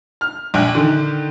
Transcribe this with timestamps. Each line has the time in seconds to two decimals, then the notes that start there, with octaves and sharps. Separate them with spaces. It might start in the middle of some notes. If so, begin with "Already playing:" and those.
0.21 F6
0.54 A#1 G5 F#6
0.75 D3 D#3